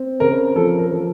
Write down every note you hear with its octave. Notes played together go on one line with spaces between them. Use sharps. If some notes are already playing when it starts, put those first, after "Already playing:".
Already playing: C4
C#3 A#4
F3 A4
A#4
F3